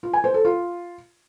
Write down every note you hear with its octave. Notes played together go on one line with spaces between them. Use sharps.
F4
G#5
C5
A4
F4